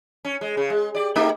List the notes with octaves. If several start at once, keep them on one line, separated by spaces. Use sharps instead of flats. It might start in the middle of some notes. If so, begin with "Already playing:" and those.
C#4
G#3
C#3
G#3
G4 D5
A3 D#4 G4